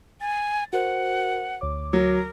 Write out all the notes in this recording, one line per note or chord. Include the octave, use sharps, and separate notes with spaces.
G#5 A6
F#4 A#4 C5 F#5
D2 C#5 D6
F#3 A#4